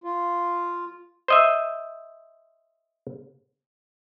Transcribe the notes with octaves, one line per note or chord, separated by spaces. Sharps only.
F4
C5 D#5 E5